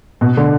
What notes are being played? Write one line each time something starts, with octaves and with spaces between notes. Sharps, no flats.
B2
D3